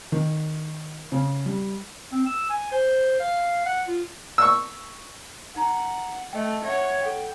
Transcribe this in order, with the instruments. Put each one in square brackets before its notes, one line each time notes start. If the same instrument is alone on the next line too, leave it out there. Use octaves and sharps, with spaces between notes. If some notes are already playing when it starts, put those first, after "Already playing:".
[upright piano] D#3
C#3
G3
[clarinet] C4
E6
G#5
C5
F5
F#5
F4
[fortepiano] C#6 E6
[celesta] D#4 A#5 [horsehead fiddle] F#5
[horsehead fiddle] A3 [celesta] D#5 G5
[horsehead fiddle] C#5 F#5 [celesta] E5
[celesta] A4 F#5 [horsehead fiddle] G5